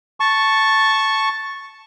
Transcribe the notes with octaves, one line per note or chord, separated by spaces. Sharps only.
A5 C#6